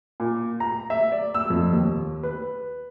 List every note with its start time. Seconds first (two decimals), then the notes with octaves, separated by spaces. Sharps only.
0.20 A#2
0.60 A#5
0.90 E5
1.12 D5
1.34 E6
1.50 F2
1.72 D#2
2.23 B4